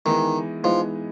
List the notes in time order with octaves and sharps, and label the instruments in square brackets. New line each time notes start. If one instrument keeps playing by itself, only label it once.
[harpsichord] D#3 [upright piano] E3 G#3 B3 D#4
[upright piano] E3 G#3 B3 D#4 [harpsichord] F3